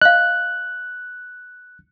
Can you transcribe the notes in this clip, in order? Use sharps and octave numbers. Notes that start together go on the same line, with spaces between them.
D#5 F5 F#6